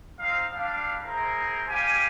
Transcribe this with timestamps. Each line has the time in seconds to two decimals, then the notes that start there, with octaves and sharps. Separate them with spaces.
0.19 C4 D#4 F5
0.51 G3 D4 F5
1.04 E4 G#4 A#4 C5 A#5
1.68 G3 G4 F5 G#5